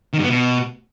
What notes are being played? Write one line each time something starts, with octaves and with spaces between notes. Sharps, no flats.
D#3
G2
B3
B2